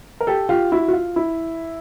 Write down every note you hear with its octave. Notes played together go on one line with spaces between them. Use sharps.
A#4
G4 A4
F4 G4
E4 F#4
F#4
F4
E4